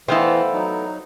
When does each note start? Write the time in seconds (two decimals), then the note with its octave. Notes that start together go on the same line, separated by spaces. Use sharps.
0.08 E3 A3 B3 E4 C5 D#5 F5 G5
0.54 F#3 D#4